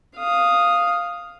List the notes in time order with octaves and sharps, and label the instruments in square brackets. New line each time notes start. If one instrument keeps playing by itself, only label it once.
[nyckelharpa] F5 D#6